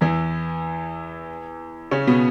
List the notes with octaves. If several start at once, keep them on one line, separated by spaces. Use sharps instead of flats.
E2 E3
C#3 C#4
B2 B3